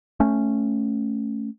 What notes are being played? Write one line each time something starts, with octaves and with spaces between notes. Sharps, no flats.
A3 C#4